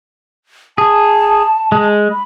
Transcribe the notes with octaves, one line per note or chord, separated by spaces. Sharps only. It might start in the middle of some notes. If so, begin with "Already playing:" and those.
G#4 A5
G#3
B5